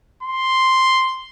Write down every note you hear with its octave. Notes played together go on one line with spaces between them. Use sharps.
C6